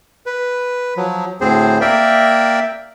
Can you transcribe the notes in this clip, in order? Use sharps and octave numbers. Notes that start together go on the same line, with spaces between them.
B4
F3 F#3
D2 A2 C4 G#4 C5
A#3 A#4 D5 E5 G5